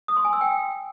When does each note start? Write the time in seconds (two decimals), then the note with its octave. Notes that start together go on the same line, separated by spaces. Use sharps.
0.08 D#6
0.17 C6
0.25 G#5
0.33 E6
0.41 G5